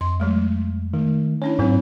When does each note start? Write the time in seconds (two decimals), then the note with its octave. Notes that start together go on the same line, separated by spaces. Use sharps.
0.01 F2 C6
0.20 F#3 G#3 A3
0.94 D#3 A3
1.42 C#4 D4 E4 C#5
1.59 G#2 F#3 C4 E4